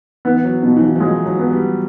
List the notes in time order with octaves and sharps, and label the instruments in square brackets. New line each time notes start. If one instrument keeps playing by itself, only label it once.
[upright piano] E3 [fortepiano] B3
[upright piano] F#3
[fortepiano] B2 [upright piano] F3
[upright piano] E3
F3
F3
[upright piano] F#3 [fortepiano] G#3
[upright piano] F#3
[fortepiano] B3
[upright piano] G3